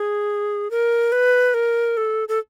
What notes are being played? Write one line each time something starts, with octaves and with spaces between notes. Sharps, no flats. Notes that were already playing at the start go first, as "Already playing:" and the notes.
Already playing: G#4
A#4
B4
A#4
A4
A4